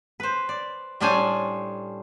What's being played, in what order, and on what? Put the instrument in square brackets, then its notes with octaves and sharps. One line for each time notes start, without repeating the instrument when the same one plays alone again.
[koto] B4 C5
D5
A2 G3 C#4 D4 C5 G#5